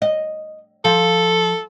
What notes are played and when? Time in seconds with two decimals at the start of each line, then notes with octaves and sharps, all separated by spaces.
0.02 D#5
0.85 F3 A4